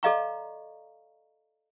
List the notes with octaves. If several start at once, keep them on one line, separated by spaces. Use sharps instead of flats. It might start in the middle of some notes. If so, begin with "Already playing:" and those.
A4 D5 D#5 F5 A#5 C#6